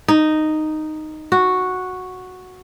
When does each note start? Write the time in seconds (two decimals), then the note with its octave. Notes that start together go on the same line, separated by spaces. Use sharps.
0.08 D#4
1.32 F#4